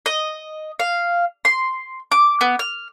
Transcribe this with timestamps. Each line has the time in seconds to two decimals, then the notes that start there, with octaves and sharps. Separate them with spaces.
0.06 D#5
0.80 F5
1.45 C6
2.12 D6
2.41 B3
2.59 F6